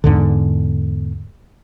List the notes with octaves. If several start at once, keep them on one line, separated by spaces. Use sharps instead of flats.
E2 G#2 D3